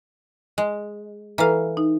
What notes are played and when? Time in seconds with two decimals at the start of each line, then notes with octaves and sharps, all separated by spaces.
0.58 G#3
1.38 E3 A4 B4 F5 A#5
1.77 D#4